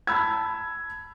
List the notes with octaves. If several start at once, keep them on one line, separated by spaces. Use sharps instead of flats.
A5 B5 E6 G#6